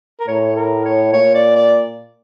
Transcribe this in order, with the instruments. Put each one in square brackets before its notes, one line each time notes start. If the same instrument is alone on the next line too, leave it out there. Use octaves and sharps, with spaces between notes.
[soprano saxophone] A#4
[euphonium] A2 [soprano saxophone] C#5
[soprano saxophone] C#5
A#4
C#5
[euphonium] A#2 [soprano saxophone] C#5
[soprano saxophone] D5
D5